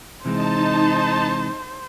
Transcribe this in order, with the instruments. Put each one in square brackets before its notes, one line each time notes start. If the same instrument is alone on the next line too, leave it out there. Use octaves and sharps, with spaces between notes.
[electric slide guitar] C3 E3 G#3 [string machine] D#4 A5 [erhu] C5